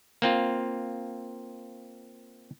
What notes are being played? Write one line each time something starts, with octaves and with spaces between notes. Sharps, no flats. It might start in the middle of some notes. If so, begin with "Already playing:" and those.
A#3 C4 F4